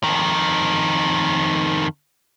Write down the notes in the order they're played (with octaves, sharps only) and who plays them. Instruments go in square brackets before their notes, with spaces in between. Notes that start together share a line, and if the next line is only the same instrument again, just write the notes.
[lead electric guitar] F2 D#3